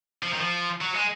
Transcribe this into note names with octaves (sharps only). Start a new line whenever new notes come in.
F3
D#3
F3
F#3
G#3